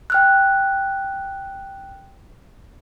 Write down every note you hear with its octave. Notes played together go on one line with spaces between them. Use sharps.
G5 F6 F#6